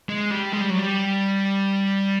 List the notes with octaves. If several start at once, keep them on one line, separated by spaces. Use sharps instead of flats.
G#3
G3
G#3
G3
F#3
G3